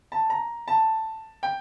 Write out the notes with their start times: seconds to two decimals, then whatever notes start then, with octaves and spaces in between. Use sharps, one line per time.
0.12 A5
0.30 A#5
0.68 A5
1.43 G5